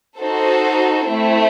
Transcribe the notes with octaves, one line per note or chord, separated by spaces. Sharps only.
D#4 F#4 A4 C5
A3 C4 E4